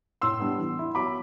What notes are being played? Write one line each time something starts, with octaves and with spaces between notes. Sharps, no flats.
A2 C6 E6
G3 B3 D4
E3
B3 E4
F#3 B5 D6